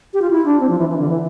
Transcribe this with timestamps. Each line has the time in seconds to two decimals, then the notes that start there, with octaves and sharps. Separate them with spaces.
0.14 G4
0.22 F4
0.31 E4
0.45 D4
0.60 C4
0.70 F3
0.79 E3
0.89 E3
0.99 D3
1.09 E3